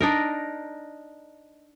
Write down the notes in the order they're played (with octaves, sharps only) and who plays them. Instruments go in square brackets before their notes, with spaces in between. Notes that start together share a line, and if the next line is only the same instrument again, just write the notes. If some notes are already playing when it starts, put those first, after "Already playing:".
[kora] D4 D#4 A#4